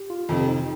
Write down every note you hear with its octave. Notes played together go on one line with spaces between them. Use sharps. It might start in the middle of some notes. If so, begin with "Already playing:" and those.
Already playing: G4
F4
F2 C3 D#3
D#4